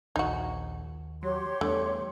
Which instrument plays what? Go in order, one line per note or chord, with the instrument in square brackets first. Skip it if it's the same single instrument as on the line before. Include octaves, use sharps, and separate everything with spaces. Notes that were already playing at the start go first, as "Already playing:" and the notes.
[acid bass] A#1 [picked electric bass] D#2 [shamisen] D#4 F#4
[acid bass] F#3 [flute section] G4 C#5 C6
[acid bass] E2 [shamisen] D3 [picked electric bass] G3 A3